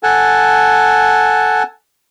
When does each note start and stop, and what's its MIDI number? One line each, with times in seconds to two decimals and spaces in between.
0.03 1.63 69
0.03 1.63 78
0.03 1.63 80
0.03 1.63 81